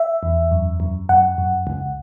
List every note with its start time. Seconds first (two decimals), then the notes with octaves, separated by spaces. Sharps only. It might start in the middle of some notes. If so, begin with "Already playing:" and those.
Already playing: E5
0.23 E2
0.51 F#2
0.80 F#2
1.09 F#2 F#5
1.38 F#2
1.67 C#2